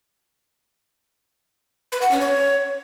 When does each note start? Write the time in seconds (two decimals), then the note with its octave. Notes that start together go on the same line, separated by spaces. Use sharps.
1.92 B4
2.02 F#5
2.11 C#4
2.21 C#5